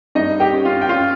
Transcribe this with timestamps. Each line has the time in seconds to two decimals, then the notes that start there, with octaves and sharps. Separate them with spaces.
0.15 G2 D#4 D#5
0.40 G4 G5
0.53 C#4
0.65 F4 F5
0.81 G5
0.89 C#4 F4 F5